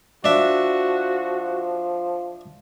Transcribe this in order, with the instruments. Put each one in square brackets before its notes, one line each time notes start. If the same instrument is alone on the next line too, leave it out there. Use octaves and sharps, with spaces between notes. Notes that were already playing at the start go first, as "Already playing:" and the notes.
[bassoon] F3 [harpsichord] D4 E5 [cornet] F#4